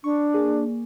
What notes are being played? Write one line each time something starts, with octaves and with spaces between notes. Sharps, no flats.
D4 C#6
A#3 G#4 D5